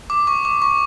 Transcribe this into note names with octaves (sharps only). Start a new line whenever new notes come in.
D6
C#6
D6
C#6